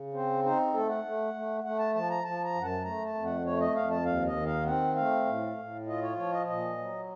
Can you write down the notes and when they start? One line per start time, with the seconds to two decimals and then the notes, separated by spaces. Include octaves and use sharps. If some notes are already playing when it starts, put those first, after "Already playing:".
Already playing: C#3
0.13 C4 C5
0.44 D#4 C5
0.74 A3 A4
0.89 F#5
1.04 A3
1.34 A3
1.64 A3 F#5
1.79 A5
1.94 F3 A5
2.10 A#5
2.24 F3 A5
2.44 A#5
2.54 F#2
2.61 F#5
2.65 A5
2.85 A3 A#5
3.05 A5
3.15 F2
3.25 F#5
3.45 A3 C#5
3.60 D#5
3.75 F2 F5
3.90 A5
4.05 D#2 F5
4.26 D#5
4.36 D#3
4.46 F5
4.65 C4 F#5
4.96 A3 F5
5.26 A2
5.57 A2
5.87 F4 D#5
6.02 C#5
6.16 F3 C#5
6.32 D#5
6.47 A#2 D#5
6.78 F#3